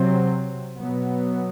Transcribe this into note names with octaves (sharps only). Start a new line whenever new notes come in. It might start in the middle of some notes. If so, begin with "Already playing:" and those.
Already playing: C3 F#3 C4
B2 F#3 B3